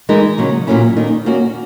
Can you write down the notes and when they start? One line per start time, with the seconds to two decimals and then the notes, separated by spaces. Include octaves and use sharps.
0.09 E3 G#3 D#4 A#4
0.38 C#3 F#3 A#3
0.67 A#2 F#3 A#3 C#4 E4
0.96 D#3 A#3 D#4
1.26 A#3 C#4 F#4